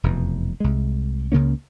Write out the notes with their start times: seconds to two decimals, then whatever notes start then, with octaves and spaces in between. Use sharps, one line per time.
0.04 F1 E2 G2 B2
0.60 C2 G#3
1.32 C#2 C#3 A#3 C#4